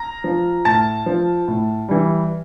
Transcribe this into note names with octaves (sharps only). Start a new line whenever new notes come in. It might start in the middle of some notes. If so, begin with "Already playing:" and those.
Already playing: A#5 A#6
F3
A2 A5 A6
F3
A2
E3 G3